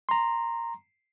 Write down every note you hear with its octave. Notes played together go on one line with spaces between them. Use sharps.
A#5 C6